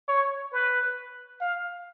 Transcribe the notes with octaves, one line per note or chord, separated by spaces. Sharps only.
C#5
B4
F5